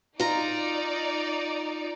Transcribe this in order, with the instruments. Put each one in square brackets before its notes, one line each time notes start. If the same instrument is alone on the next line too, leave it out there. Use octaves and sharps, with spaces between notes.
[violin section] D#4 D5 [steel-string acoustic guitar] F4 A#5